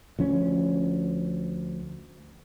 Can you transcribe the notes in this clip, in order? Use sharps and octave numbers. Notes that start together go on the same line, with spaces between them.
D2 F3 C#4